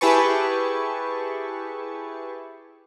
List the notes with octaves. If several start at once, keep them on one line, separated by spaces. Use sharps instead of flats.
E4 G4 G#4 B4 A5 C#6